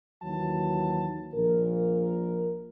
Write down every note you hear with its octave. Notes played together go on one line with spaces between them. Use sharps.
D#2 E3 F#3 A5
A#1 A#2 A#4